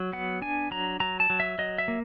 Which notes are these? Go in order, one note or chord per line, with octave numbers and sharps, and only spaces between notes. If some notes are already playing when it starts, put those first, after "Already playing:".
Already playing: F#3
B3 F#5
D4 G#5
F#3 A#5
F#3 A#5
A5
F#3
E5
F#3 D#5
E5
A#3